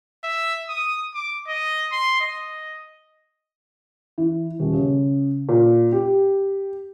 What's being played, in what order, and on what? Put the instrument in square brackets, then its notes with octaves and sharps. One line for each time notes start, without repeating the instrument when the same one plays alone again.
[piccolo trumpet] E5
D#6
D6
D#5
C6
D#5
[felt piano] E3
D#1
C#3
A#2
G4